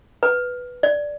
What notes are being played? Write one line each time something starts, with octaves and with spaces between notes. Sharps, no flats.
B4
D5